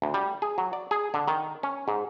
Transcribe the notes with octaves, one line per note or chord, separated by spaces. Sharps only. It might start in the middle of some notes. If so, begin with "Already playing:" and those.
D2
G3
G#4
F#3
D5
G#4
D3
D#3
C#4
G#2